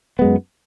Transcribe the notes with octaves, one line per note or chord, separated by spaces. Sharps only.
F#2 G#3 B3